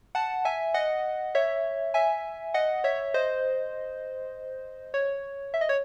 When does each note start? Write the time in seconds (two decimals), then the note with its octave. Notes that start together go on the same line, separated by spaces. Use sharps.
0.15 F#5 A5
0.45 E5 G#5
0.74 D#5 F#5
1.35 C#5 E5
1.94 E5 G#5
2.54 D#5 F#5
2.84 C#5 E5
3.14 C5 D#5
4.94 C#5
5.54 E5
5.61 D#5
5.69 C#5